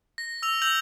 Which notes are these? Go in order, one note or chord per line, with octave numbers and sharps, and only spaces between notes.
A#6
E6 F7
E6 G6 F7 F#7